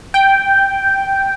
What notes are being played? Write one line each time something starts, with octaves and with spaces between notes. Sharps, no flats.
G5